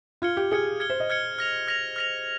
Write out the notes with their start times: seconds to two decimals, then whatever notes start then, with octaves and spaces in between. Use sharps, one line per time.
0.22 F4 F6 G#6 C#7 G7
0.37 G4
0.51 G#4 F6 G#6 C#7 G7
0.80 F6 G#6 C#7 G7
0.90 C5
1.00 D#5
1.10 F6 G#6 C#7 G7
1.39 F6 A#6 F7
1.68 F6 A#6 F7
1.96 F6 A#6 F7